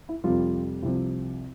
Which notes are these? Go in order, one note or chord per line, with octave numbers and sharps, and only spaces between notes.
E4
F2 C3 F3 G3 F4
C2 C3 F3